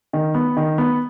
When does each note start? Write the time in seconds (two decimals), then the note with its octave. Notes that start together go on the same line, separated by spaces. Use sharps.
0.13 D#3
0.35 B3
0.57 D#3
0.78 B3